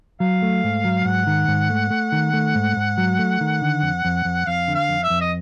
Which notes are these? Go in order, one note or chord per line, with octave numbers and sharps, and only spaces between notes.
F#3 F5
A3
G#2
F#3
G#2 F#5
D#3
G#2
A3
A3
D#3
A3
G#2
G#2
F#3
A3
D#3
D3
F2
F2
F2
F2 F5
D3
F5
F2
E5
F2
D#5